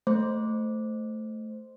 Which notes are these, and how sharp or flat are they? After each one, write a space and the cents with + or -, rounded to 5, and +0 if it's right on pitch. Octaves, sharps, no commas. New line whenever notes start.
A3 +0 C5 -5